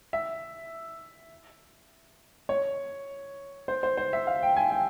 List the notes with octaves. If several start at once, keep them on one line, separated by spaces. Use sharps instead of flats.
E5
C#5
C5
C5
C5
E5
F5
G5
G#5
G5